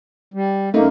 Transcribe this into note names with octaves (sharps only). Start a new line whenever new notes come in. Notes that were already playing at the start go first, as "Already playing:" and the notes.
G3
F#2 A3 A#3 D#4